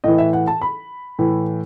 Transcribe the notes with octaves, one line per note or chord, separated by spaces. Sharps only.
A2 E3 D#5
E5
F#5
A5
B5
A2 E3